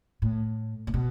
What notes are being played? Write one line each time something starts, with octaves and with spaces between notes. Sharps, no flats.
A2
A2
B2